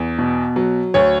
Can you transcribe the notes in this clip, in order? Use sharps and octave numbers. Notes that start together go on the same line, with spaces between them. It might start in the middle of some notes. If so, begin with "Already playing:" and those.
Already playing: E2
B2
F#3
D2 C#5